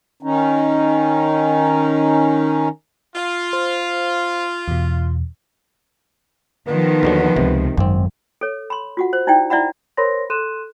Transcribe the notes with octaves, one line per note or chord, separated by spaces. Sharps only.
D#3 C#4 D#4
F4
C5
E2 B2
D#3 F3 B3
D#2 D3 F#3
C#2 C3
G#1 F#2 C4
A4 C#5
B5 C6
F4 F#4 F#5
C5
D#4 E4 D5 G5
E4 D5 E5 F#5 B5
A#4 C5 C#5 B5 C6 A#6
A4 C6 F#6 D#7 E7